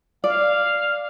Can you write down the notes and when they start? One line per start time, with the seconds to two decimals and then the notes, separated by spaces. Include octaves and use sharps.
0.24 D5 F5